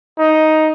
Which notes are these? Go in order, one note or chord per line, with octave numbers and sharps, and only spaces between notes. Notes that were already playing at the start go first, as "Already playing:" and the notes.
D#4